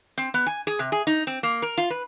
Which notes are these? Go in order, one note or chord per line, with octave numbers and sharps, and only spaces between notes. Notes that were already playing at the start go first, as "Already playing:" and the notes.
C4
B3
G#5
G#4
C3
G#4
D#4
C4
A#3
A#4
F4
B4